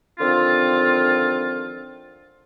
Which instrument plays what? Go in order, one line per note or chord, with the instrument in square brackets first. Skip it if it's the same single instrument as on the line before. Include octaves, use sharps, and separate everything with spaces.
[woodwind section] D3 D#3 F3 C4 F4